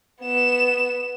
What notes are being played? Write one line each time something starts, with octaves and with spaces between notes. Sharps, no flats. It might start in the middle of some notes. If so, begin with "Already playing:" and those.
B3 E7